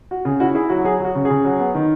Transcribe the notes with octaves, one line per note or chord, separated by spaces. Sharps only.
F#4
C#3 G#4
E4 F#4
E4 G#4
F#3 F#4
F#3 G#4
F#3 F#4
C#3
G#4
C#3
F#3
B3
D#3